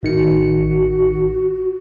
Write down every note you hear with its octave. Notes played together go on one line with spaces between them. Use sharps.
A1 D#3 F#4 C#7